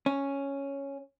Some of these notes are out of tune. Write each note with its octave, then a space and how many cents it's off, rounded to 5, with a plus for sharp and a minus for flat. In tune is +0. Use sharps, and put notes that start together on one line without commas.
C#4 +0